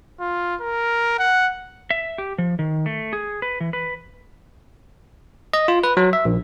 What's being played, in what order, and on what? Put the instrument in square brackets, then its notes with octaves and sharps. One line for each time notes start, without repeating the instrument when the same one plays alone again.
[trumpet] F4
A#4
F#5
[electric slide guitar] E5
G4
F3
D#3
A3
G#4
B4
E3
B4
[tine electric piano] D#5
F4
B4
F#3
E5
A#1